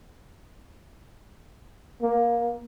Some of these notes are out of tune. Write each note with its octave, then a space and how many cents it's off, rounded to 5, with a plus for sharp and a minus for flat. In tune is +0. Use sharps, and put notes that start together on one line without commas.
A#3 +20